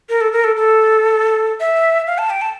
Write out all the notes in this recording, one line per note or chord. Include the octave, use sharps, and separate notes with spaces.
A#4
A4
A#4
A4
A4
E5
F5
A5
G5
A5